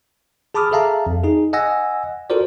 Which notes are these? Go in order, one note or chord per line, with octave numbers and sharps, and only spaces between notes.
G#4 A5 B5 D6 D#6 F6
G#4 A4 E5 F5 A5 A#5
F2
D#4 G#4
D#5 F#5 G#5 E6 A#6
F4 F#4 A4 A#4 C5 D5